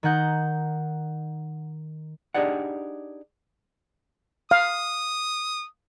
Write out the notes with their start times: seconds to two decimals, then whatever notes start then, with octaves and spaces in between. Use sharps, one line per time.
0.03 D#3 D#4 F#5 G6
2.34 D4 D#4 G4 G#4 D5 F#5
4.51 F5 D#6